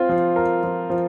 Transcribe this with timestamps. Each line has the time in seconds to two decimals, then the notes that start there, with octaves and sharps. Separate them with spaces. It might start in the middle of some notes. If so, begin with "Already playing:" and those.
Already playing: C4 F4
0.09 F3
0.36 A#4
0.63 F3
0.90 F3